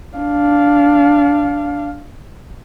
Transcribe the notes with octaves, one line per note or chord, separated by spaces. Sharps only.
D4 F5